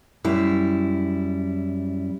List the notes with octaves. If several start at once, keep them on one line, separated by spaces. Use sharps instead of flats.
F#2 G3 E4